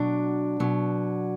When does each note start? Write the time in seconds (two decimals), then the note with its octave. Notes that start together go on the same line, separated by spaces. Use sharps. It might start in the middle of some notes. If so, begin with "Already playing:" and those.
Already playing: B2 F#3 D4
0.60 B2 F#3